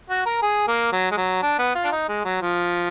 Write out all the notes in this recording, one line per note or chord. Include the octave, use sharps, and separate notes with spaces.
F#4
A#4
G#4
A#3
F#3
G#3
F#3
D4
B3
F4
D4
D#4
G#3
F#3
F3